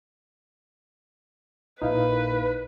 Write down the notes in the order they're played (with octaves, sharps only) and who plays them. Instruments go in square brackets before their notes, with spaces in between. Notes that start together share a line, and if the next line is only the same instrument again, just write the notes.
[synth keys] A#1 A#2 A#4 [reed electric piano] D#4 E4 F5 [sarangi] B4